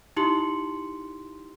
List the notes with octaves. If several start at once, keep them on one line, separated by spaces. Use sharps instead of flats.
D#4 E4 G4 C6 C#7 F#7